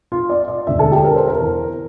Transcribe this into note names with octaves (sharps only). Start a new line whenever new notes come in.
F4
D5
D5
E1 D2 D3 E5
A4
G4
A#4
C5
A#4
E2 E3